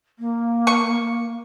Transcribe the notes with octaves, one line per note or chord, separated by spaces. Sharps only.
A#3
C#6